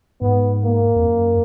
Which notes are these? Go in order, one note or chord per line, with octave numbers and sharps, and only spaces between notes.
G#2 B3
A#3
F2
F#2